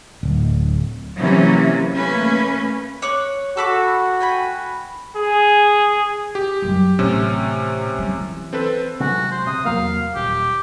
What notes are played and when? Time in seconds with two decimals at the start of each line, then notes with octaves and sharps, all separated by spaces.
0.23 D1
1.18 C3 E3 F#3 A#3 C#4
1.93 A3 A#3 C#4 B4
3.02 C#5 D6 F#6
3.57 F#4 A4 B5 D6
4.20 G5 G#5 B5
5.16 G#4
6.35 G4
6.62 F#2 G3
6.99 A1 C3 C#4
7.99 G3
8.16 E3
8.53 C4 A4 B4
9.00 C3 F#3 G#3 F#4
9.31 C5
9.47 C3 D#6
9.65 E2 F#3 A#3 F5
10.15 D#1 G4